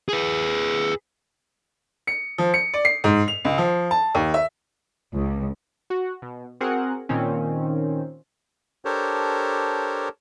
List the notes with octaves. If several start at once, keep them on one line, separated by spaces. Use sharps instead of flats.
G#4 B4
C#7
F3
C#7
D5
C7
G#2
F7
C#2
F3
A5
D#2
E5
C#2
F#4
B2
C4 F#4 G#4 A#4 F#5
A#2 D#3 C4 C#4
D4 G4 A4 A#4 C5 C#5